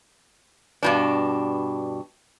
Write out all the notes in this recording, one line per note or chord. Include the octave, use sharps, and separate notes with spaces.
G2 B2 D4